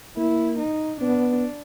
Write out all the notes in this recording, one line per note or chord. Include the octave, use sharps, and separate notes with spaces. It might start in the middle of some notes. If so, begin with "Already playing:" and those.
A#3 E4
D#4
B3 D4